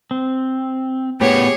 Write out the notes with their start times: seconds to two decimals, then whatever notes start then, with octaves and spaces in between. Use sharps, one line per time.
0.11 C4
1.21 A2 B3 G4 G#4 C#5